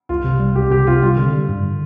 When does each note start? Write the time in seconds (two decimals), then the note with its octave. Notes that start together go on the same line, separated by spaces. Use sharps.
0.09 C2 F4
0.24 C3
0.40 G3
0.55 C2 G4
0.71 C3 G4
0.87 C3 F4
1.02 G3 F4
1.17 D3
1.33 G3
1.49 G2
1.63 D3